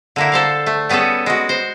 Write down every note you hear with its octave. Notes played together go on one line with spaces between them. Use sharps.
D3 A#3 E4
A4 C5 F5
A3
G3 B3 C#4 G#4 A4
G#3 F#4
C5